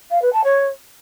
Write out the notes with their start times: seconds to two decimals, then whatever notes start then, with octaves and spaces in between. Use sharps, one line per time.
0.11 F5
0.22 B4
0.33 A5
0.44 C#5